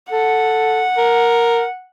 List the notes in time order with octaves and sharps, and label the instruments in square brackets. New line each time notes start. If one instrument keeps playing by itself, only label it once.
[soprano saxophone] A4 [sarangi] F#5
[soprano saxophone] A#4